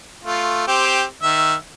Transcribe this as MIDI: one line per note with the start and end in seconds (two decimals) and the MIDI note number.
0.24 0.63 57
0.24 0.63 65
0.67 1.04 60
0.67 1.04 67
1.23 1.54 51
1.23 1.54 76